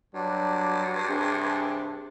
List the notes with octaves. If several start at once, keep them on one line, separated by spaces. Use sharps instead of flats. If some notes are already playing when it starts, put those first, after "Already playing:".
G2 F#3 D4
C3 D4 G#4